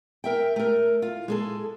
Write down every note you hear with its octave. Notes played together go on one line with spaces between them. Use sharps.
A#4 E5 G5
A3 A#4
F4
G#3 G#4 A4